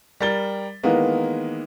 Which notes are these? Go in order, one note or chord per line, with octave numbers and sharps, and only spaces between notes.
G3 A#4 A6 G7
D#3 E3 G#3 A#3 B3